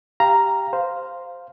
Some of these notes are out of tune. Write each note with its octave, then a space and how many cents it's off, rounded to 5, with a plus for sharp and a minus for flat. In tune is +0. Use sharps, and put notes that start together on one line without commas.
G4 +0 F5 -15 A#5 +0
C5 -5 F5 +0